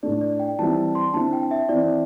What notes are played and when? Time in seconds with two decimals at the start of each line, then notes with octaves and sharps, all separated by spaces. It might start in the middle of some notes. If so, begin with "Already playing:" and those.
0.03 A2 A3 D4 D5
0.21 D5
0.40 G5
0.59 E3 G3 C4 E4 A5
0.77 A5
0.95 C6
1.14 D3 C4 E4 A5
1.33 G5
1.51 E5
1.69 E3 C4 E4 D5